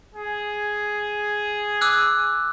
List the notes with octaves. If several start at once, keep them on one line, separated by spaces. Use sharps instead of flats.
G#4
D6 E6 F#6